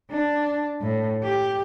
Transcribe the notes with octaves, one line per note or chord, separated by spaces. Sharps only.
D4
A2
G4